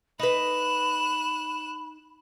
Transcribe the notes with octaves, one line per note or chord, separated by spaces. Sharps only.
D#4 B4 B5 F#6 E7